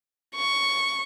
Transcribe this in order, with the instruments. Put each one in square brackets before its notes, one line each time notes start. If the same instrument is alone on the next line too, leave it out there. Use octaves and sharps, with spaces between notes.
[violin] C#6